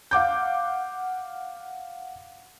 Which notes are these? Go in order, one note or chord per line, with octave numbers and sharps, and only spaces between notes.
F5 F#5 D6 G6